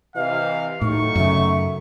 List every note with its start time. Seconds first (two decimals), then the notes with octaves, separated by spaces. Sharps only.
0.16 C3 E3 D#5 F5
0.82 A2 D#3 F#3 A3 D#4 C#6
1.16 F#2 C#3 E5